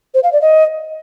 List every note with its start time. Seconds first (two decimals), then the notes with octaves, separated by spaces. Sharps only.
0.14 C5
0.23 F5
0.32 D5
0.41 D#5